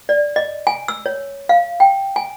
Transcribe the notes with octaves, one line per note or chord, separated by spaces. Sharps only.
D5
D#5
G#5
E6
C#5
F5
G5
G#5